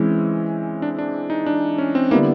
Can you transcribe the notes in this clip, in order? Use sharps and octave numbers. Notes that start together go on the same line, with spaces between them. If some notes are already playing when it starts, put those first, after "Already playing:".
Already playing: E3 G#3 C4 C#4 E4
D4
D4
D#4
D4
C#4
C4
D3 G3 A#3 B3 E4